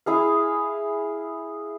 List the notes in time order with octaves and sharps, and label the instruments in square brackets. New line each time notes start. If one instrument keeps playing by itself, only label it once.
[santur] E4 G#4 F5